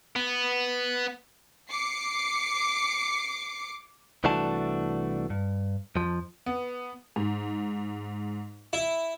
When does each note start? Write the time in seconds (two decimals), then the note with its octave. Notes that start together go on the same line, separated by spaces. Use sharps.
0.16 B3
1.70 D6 C7 C#7
4.24 C2 E3 A3 D4 F#4 A5
5.30 G2
5.96 F2 F3
6.46 B3
7.16 G#2
8.73 E4